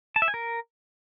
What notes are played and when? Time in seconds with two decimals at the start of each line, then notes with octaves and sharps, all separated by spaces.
0.16 A5
0.22 E5
0.28 G#5
0.34 A#4